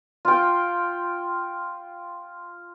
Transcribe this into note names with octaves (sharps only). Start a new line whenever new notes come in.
F4 G5